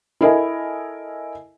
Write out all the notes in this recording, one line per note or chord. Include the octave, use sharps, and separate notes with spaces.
E4 A4 A#4 D#5 E5 G#5